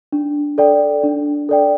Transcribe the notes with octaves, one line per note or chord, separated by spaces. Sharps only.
D4
A4 D5 G5
D4
A4 D5 G5